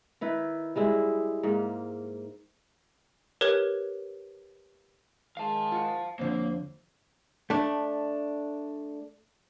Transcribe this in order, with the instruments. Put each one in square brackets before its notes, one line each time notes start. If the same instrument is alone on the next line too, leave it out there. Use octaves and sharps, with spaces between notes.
[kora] D#3 E4 B4
G3 G#3 E4
G#2 A#3
[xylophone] G4 A#4 B4 C#5 G#6
[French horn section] D#3 G#3 [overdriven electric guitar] F5 A5
[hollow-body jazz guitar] F4 F#5
[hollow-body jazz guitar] F2 D3 F3 [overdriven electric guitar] A#3 [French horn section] C5 C#5
[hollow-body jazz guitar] A3 D4